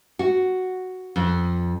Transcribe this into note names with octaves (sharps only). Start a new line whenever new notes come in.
F#4
F2